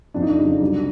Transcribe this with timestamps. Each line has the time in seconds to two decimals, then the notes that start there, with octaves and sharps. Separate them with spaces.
0.14 F2 D4
0.22 D#4
0.30 D4
0.38 C#3 F#3
0.61 C2